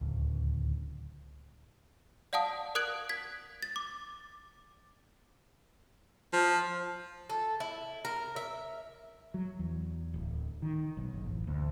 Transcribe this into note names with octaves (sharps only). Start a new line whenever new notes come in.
D1 C#2
D5 F5 F#5 A5 D#6
A#4 D#6 F#6 G#6 D7 F#7
G#6 B6
A6
D6
F3
A4
E4
A#4
E5
F#3
E2
D1
D#3
B1
F#1
A1
D2